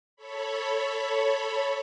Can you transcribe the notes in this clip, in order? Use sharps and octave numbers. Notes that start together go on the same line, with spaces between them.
A4 C#5 B5